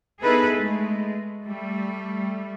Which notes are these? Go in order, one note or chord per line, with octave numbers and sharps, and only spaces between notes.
B3 D#4 E4 G#4 A4 B4
G#3 A3
G3 A3